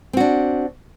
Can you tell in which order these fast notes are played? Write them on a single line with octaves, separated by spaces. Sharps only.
C4 F#4 D4